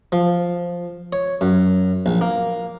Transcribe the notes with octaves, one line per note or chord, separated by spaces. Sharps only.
F3
C#5
F#2
A#1
A#3